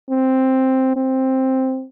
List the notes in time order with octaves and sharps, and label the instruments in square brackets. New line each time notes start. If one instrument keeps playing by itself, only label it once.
[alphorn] C4
C4